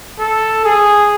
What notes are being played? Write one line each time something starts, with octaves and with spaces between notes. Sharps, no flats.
A4
G#4